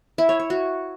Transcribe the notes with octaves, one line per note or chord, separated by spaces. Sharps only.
E4
C#5
C#5
F#4